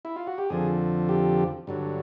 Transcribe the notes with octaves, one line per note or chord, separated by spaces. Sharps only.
E4
F4
F#4
G4
F2 D3 F3 G#4
G4
G2 D3 F#3